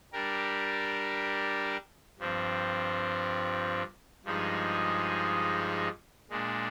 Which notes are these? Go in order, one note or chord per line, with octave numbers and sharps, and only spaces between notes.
G3 D4 G4 A#4
G2 F3 C4
G2 F3 G#3 D#4 G#4
A#2 G#3 D4